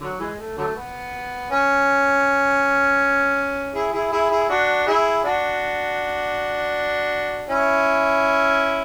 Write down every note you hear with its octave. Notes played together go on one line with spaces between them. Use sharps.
D3 F#3
E3 G#3
A3
D3 F#3 A3
B3
C#4
E4 G#4
E4 G#4
E4 G#4
E4 G#4
D4 F#4
E4 G#4
D4 F#4
C#4 E4